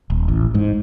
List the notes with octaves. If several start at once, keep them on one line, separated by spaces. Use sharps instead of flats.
D#1
A1
G#2